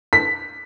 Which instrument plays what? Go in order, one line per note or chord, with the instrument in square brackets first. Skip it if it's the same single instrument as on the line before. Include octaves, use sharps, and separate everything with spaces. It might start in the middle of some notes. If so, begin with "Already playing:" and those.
[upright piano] B6